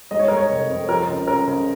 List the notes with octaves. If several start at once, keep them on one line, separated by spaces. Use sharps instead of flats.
G#3 D#5
C#5
G#3 A#4
C#5
F1
F2
F3 A#4
C#2
C#3 A#4
C#3